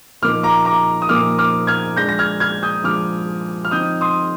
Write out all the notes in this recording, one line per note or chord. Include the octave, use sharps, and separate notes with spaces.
A#2 F3 A#3 D#4 D6 F6
A#5 D6
A#5 D6
D#6
A#2 F3 A#3 D#4 D6 F6
D6 F6
F6 G#6
F3 G#3 D4 G6 A#6
A#6
F6 G#6
F6 G#6
D#6 G6
F3 G#3 D4 D6 F6
F6
F3 C4 D#4 D#6 G6
C6 D#6